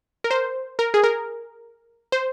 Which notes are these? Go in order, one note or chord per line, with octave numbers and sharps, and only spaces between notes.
A#4
C5
A#4
G#4
A#4
C5